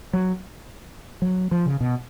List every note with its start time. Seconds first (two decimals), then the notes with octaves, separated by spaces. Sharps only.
0.13 F#3
1.22 F#3
1.51 F3
1.66 C#3
1.81 B2